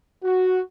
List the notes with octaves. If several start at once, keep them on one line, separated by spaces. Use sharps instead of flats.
F#4